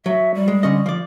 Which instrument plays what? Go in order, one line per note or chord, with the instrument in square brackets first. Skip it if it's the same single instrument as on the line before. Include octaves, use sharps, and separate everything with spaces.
[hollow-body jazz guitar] F#3 [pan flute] E5
[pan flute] G3
[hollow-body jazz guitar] G#3
D3 C#4 D#5
F3 D5